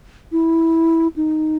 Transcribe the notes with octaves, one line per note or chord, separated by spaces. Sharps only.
E4
D#4